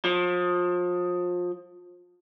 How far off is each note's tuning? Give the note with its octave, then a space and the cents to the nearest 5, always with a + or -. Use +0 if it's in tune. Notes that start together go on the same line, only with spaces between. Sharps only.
F3 +30